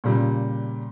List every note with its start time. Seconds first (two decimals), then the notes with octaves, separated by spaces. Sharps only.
0.04 A#2 C#3 G3